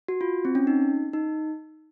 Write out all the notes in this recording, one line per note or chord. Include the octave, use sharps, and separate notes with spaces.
F#4
F4
C4
C#4
D#4
D#4